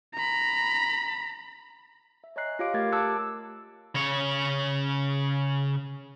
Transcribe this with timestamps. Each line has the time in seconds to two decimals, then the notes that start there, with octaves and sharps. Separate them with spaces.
0.14 A#5 B5
2.24 E5
2.36 C#5 D#5 G#5 A#5 F#6 C7
2.59 F4 G4 C#5 F5 D6 D7
2.74 A3 G4 A#4 G#6 A6
2.92 A5 D6 E6 F#6 C#7
3.95 C#3 C#5